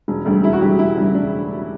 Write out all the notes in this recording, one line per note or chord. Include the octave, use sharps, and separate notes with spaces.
E1
D2 C#3 G3
E1 E4
F#4
D2 C#3 G3 G4
E1 E4
D2 C#3 G3
E1 D4